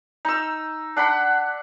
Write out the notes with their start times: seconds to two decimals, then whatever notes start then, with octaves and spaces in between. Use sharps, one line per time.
0.25 D#4 E6
0.97 D4 F#5 B5